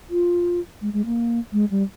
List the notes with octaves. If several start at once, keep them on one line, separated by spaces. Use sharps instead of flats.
F4
G#3
G#3
A#3
G#3
G3